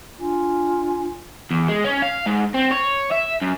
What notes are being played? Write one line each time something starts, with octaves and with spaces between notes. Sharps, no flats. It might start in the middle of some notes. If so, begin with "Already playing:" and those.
D4 F4 G#5
E2
G#3
C#4
F5
G#2
C4
C#5
E5
F#2